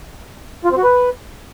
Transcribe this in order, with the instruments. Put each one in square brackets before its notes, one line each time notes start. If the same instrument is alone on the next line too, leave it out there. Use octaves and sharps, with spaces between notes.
[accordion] F4
C4
F#4
B4